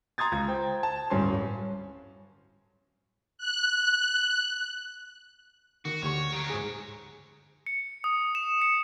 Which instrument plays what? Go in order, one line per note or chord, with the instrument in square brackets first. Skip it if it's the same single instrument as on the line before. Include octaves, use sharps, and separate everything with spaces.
[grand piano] A#5 C6 D#6 G#6 A6
C#2 G#6
C5 G5 A#5
A5
D1 G2 C#4 G#5 C6
[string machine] F#6
[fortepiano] D#3 [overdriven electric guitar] F#4
[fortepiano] D2 G4 C#6 [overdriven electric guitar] C#5
[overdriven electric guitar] D#3 F#3
[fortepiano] G#2 G#4
[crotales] C#7
D#6
E7
C#7